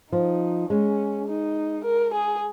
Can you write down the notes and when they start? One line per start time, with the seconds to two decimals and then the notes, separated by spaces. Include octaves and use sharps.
0.12 F3 D#4
0.70 G#3 C#4
1.28 D#4
1.85 A#4
2.14 G#4